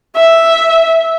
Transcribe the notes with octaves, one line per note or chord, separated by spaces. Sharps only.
E5